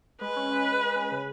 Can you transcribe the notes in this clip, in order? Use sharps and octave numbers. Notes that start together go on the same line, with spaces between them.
G#3 B4
C#4
G#3
G#3
G#3
C#4
C#3